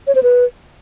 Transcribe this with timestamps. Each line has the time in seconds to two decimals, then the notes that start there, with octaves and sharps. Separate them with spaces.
0.07 C#5
0.15 C5
0.23 B4